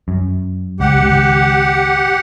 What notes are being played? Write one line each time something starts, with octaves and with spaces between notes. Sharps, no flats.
F#2
C#2 G4 F#5
G#1 C#2